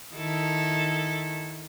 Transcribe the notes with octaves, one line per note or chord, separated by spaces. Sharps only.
D#3 E4 A4